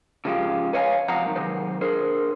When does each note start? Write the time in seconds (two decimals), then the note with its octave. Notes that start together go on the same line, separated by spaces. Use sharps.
0.25 C#3 F3 G#3 F4 G4
0.73 B4 C#5 D#5 F5 F#5 G#5
1.08 C#2 C3 F3 F5 F#5 A#5
1.24 F#2 A#2 D#3
1.36 C3 D#3 F#3 C5
1.81 D4 G#4 A#4 C5